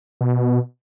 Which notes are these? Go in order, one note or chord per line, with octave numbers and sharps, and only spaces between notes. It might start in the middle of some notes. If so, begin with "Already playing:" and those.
B2